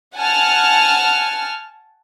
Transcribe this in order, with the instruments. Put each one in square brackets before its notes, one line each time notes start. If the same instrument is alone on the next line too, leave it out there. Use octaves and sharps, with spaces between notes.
[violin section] F#5 G#5 A5 F6